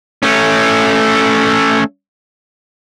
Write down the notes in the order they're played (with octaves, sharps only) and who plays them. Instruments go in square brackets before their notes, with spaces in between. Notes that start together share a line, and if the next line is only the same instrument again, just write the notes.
[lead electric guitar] A3 C#4